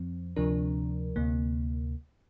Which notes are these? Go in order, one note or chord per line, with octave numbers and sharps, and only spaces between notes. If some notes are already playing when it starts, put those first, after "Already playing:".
Already playing: F2 F3 C4
D2 C3 F3 D4 A#4
D2 C3 A#3